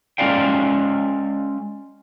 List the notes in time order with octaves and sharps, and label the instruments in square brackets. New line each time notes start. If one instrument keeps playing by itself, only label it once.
[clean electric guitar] G#3 C#4 F4 D5 F5 G5